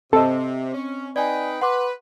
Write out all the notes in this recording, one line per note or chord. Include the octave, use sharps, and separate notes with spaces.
C3 C4 A4 D#5
C#4
D#4 B4 D5 G5 G#5
B4 F#5 C6 D6